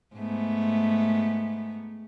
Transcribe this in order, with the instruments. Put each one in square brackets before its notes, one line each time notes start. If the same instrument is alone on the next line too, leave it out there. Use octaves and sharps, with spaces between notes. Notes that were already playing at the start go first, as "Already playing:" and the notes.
[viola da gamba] G#2 A3 B3